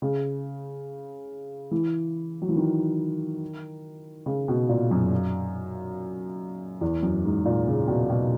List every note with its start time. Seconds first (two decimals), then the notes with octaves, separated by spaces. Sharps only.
0.02 C#3
1.71 E3
2.42 F#3
2.49 E3
2.56 D#3
4.26 C#3
4.48 B2
4.69 A#2
4.91 F#2
6.81 E2
7.03 F#2
7.25 G#2
7.45 A#2
7.67 C#3
7.88 B2
8.10 B2